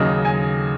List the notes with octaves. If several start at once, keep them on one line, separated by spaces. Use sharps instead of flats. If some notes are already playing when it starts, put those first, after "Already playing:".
Already playing: D#2 C#3 F#3 D#5
G#5